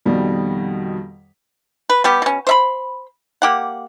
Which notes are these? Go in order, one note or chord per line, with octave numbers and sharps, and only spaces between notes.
F2 B2 D#3 G3
B4
G3 B3 G4
B2 C#4
C5 E5 B5
A#3 G4 F#5